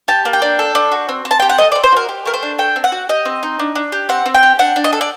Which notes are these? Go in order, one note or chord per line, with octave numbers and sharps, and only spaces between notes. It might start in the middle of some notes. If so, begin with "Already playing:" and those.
G4 A5
A#3
G5
D4
A4
D4
F#4
C4
C4
A5
G4 G5
F#5
A4 D#5
D5
C4
C5
F#4 A#4
G4
A3 A#4
C5
D4
A4 G5
C4
F#5
F#4
G4 D#5
C4
D#4
D4
D4
G4
C4 F#5
C4
G5
G4
D4 F#5
D4
D#5
A4
D5